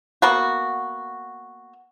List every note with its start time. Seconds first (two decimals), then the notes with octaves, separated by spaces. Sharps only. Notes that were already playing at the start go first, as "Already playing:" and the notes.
0.22 A#3 B3 F#4